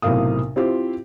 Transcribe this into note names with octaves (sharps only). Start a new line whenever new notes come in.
B1 A2 C3 A#4 F5 D#6
C4 E4 F4 G4 C5